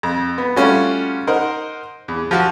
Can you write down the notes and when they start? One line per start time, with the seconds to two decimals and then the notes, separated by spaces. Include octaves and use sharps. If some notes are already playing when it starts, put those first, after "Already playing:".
0.03 F2
0.38 B3
0.56 G3 A3 C#4 F4 F#4
1.27 D#4 A#4 C5 F#5
2.08 E2
2.31 F3 F#4 A5